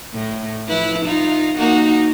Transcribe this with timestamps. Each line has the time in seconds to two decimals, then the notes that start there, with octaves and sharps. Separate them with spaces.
0.14 A2
0.68 F3 E4 B4
1.05 D#4 F4
1.57 A#3 D#4 F#4